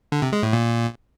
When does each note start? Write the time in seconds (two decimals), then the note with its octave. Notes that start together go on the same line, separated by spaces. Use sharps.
0.12 D3
0.22 C3
0.33 G#3
0.43 A2
0.53 A#2